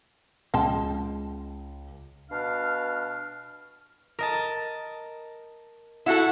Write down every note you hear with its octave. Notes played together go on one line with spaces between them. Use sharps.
C#2 G#3 G5 A5
B2 D4 F5 F6
A#4 D#5 A5
E4 F#4 A4 F#5